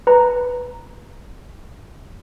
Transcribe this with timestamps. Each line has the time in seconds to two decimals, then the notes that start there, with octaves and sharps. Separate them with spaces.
0.07 B4 A#5